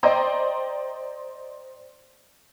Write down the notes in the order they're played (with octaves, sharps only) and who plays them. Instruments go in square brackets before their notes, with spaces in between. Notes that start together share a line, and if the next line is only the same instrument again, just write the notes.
[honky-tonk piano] C5 D5 D#5 G5 A#5 C6